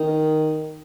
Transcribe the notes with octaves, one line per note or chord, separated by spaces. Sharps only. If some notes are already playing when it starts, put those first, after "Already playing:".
Already playing: D#3